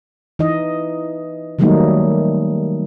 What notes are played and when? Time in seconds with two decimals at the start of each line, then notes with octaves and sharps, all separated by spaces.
0.39 E3 D#4 D#5
1.59 D#3 F#3 G3 A3 A#3 D#4